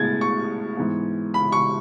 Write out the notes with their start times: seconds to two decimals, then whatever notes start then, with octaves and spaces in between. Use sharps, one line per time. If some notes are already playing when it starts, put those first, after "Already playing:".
Already playing: A2 G#3 B3 G#6 A6
0.21 C#6
0.77 G#2 E3 B3
1.34 B5
1.52 C#6